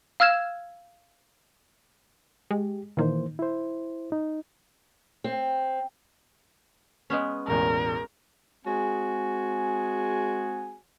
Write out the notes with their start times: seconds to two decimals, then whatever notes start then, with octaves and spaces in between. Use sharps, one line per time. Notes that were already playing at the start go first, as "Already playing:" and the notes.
0.20 F5 E6 F6 G#6 E7
2.51 G#3 G4
2.97 A#2 D#3 E3 A#3 C5
3.39 E4 C5
4.12 D#4
5.24 C4
7.10 G#3 B3 C#4
7.47 E1 A1 E2 A#4
8.66 G#3 C4 F#4 G#4 G#5